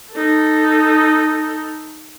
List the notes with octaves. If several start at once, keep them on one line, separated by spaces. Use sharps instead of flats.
D#4 A4